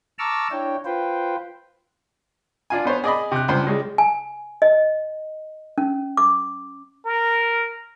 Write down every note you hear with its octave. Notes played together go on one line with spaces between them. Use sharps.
A5 A#5 C#6 D6 E6 F6
D4 E4 C#5 G5
F4 B4 C5 G5
D4 F4 G#5
B3 C5 C#5
G#4 D5 D#5 B5
C3 F#6
C#2 G2 C5
C#3 G3 G#3
G#5
D#5
C#4
D6
A#4